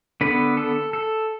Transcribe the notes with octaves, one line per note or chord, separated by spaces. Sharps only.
D3 B3 B4
A4
A4